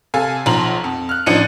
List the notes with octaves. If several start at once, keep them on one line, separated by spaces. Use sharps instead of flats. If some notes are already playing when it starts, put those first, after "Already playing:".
C3 A4 F5 G#5
B1 F3 A#5 C6 F#7
F2
F6 F#6
A1 F3 D4 D#4 C#7 D#7